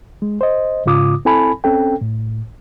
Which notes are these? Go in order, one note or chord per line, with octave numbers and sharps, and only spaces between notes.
G#3
C5 D#5
G#2 C#3 F4 D6 D#6
C4 E4 A4 G#5 A5 B5
C4 C#4 A4 G5
A2